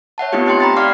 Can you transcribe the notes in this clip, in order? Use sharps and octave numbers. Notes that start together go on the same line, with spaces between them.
C#5 E5 F#5 A5
A3 B3 C4 D#4 F4 G4
C4 D#4 G4 G5 C6
A#5 B5 A6
D5 F5 D6 F6 C7